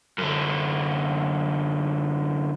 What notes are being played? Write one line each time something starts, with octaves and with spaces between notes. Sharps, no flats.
F#2 D3